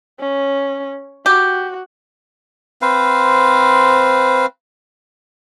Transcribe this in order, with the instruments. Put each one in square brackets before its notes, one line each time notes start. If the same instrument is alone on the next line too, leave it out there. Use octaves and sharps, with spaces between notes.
[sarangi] C#4
[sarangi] F#4 [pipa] G4
[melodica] C4 B4 C5 F5